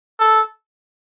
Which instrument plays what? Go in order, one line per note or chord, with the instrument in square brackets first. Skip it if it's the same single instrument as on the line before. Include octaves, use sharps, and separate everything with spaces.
[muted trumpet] A4